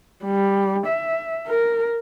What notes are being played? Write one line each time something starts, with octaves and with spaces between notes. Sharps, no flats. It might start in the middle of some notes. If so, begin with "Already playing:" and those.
G3
E5
A#4